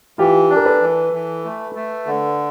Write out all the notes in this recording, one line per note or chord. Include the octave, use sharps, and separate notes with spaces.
E3 F4 G4
D4
A#4
A4 B4
E3
E3
A3
A3
D3